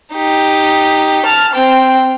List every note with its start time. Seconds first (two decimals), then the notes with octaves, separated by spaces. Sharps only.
0.14 D#4 G4
1.26 A5 F6
1.54 C4 G5